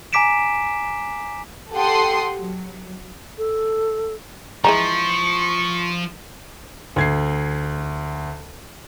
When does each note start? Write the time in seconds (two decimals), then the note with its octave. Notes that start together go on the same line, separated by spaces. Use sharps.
0.13 G#5 A#5 D6 B6 D7 E7
1.74 G4 A4 F#5 G5 C6 D#6
2.38 F#3
3.38 A4
4.64 E3 F3 G#3 A#5 C#6
6.96 D2 G#6 C7